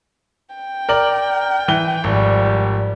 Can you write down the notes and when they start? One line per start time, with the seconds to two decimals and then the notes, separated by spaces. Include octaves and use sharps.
0.55 G5
0.89 A#4 D5 F#7
1.68 E3 G7
2.04 G#1 F3 G3